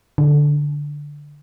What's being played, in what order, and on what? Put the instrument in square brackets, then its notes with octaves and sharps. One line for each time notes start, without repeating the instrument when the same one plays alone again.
[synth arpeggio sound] D3